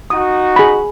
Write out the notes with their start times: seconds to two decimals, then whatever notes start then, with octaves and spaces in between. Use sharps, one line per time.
0.10 D#4 F#4 D#6
0.56 G#4 B5